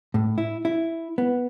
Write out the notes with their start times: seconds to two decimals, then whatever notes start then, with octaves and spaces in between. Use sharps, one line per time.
0.14 A2
0.38 E4
0.65 E4
1.18 B3